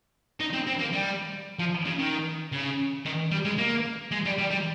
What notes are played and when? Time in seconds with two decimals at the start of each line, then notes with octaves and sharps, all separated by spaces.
0.40 D#4
0.53 C4
0.67 C4
0.79 A#3
0.93 G3
1.59 F3
1.86 C#3
1.99 D#3
2.52 C#3
3.05 D#3
3.31 G3
3.45 G#3
3.58 A#3
4.11 G#3
4.25 G3
4.38 G3
4.50 G3